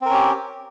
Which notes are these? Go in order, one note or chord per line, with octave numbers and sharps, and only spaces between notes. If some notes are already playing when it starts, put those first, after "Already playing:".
C4 C#4 G4 A#4